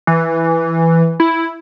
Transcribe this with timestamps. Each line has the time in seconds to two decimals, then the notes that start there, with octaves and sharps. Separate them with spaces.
0.07 E3
1.20 E4